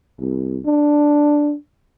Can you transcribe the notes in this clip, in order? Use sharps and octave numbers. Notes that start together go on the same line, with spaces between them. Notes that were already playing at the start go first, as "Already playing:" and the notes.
C2
D4